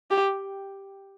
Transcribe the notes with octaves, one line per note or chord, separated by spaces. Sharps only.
G4